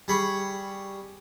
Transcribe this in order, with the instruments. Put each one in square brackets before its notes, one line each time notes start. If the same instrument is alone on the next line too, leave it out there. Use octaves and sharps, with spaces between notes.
[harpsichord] G3 G#4 B5 C#6